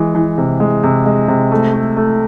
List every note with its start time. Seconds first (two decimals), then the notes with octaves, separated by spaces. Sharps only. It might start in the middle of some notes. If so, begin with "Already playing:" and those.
Already playing: E3 G#3
0.15 E3
0.38 C3
0.60 G#3
0.84 C3
1.06 G#3
1.28 C3
1.52 A3
1.73 A3
1.97 A3